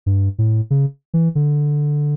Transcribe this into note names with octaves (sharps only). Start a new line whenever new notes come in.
G2
A2
C#3
E3
D3